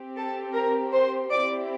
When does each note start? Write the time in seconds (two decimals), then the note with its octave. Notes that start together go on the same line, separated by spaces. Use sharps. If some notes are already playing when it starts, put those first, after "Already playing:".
Already playing: C4 G4
0.16 A4 A5
0.54 A#4 A#5
0.92 C5 C6
1.30 C4 E4 G4 D5 D6